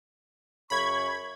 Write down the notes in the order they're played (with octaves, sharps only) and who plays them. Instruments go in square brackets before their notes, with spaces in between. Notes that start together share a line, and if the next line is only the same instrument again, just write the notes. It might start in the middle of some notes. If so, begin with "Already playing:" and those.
[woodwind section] F#2 C#3 C#6 [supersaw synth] B5 G#6